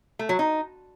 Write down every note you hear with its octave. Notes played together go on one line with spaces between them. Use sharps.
A3
F#3
D#4